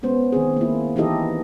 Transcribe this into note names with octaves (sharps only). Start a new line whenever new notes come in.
G#3 B3 C#4 C5
D#3 C4 G#4
A#3 E4
E3 D#4 E4 G4 A4 D#5